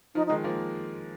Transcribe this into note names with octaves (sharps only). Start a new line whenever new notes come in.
F3 D#4
D#4
D#3 G#3
F3 A#3